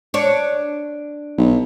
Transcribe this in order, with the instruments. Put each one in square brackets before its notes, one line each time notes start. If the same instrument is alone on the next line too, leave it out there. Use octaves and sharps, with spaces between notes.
[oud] D4 C#5
[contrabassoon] B1